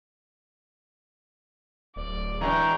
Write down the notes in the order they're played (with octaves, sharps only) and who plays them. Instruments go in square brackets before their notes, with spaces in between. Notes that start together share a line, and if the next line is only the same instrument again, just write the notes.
[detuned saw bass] D1 [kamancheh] D5
[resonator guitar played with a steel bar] E3 G#3 D4 [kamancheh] G5 C#6 [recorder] A#5